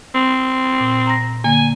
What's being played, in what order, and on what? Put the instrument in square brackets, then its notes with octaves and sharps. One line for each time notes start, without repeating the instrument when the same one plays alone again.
[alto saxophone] C4
[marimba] A#2
A#5 A#6
[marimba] D3 A#3 [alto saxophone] G#5